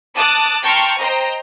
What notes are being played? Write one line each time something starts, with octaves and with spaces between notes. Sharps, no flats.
A5 D6 D#6 F#6 A6
G5 A5 A#5 C6 C#6 F6
C5 D#5 G5 A#5